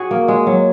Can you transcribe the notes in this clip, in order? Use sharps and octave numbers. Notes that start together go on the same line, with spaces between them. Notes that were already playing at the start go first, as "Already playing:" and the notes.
Already playing: F#4 G#4
A#3
G#3
F#3